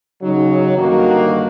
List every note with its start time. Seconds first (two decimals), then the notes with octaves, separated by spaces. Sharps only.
0.22 C#3 F#3 D#4
0.77 G2 D3 D#3 A#3 F#4